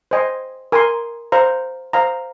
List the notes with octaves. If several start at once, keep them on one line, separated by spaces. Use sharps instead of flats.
C5 D#5 G#5 C6
A#4 G#5 C6
C5 F5 A#5
C5 F5 A#5